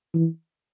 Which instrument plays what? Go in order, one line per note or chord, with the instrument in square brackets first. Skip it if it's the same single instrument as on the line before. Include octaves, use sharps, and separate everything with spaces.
[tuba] E3